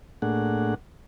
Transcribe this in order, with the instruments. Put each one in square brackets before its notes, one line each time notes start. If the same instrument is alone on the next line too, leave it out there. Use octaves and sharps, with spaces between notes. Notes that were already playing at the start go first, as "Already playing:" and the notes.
[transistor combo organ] A2 A3 A#3 D4 G#4 F#5